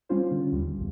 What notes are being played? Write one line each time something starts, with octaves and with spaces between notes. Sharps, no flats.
G3 C#4 F4 C5
D3
D#2 G3
A#1 E2